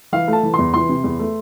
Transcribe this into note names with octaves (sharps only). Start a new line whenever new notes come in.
E3 F5
A3 A5
E3
E2 C6
E3 C6
C3
E2
A3